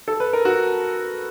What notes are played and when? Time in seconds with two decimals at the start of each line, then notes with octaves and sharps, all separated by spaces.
0.08 A4
0.20 B4
0.33 A#4
0.45 F#4